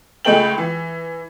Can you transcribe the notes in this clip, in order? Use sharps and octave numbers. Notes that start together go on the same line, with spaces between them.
C#2 G#3 A3 G5 F#7
E3